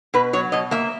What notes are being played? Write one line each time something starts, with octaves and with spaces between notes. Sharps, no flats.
B2 B4
F#3 C#5
B2 D#5
A#3 E5